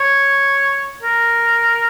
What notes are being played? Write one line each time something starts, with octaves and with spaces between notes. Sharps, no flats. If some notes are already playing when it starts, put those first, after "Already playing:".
Already playing: C#5
A#4